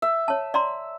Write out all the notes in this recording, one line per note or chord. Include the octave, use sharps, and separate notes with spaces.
E5
C#5 A5
D5 A#5 C6